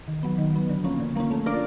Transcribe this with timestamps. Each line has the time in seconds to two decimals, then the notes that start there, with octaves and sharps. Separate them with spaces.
0.08 D#3
0.23 F#3 B3
0.38 D#3
0.53 F#3 B3
0.69 D3
0.84 F3 A#3 C#4
1.00 D3
1.15 F3 A#3 C#4
1.31 A3
1.46 D4 F4 A#4 D5